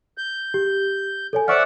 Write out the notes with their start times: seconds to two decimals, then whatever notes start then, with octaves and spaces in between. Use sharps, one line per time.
0.18 G6
0.54 G4
1.33 A4 C#5 G#5
1.48 C5 D5 E5 F#5 C#6 F6